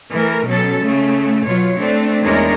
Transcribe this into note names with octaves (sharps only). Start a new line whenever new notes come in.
E3 A3 A#4
B2 F#3 C#4 A4
C#3 A3
B2 F#3 F4 C#5
A3 C4 D4
E2 D#3 G#3 D4 A#4 C#5